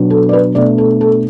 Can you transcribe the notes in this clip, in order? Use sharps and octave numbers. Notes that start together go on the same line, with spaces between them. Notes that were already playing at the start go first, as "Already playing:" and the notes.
Already playing: B2 F#3 B3 D4
A4
D5
B4
B2 A3 D4 D5
A4
A4